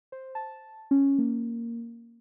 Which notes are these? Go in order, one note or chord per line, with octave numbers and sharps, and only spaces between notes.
C5
A5
C#4
A#3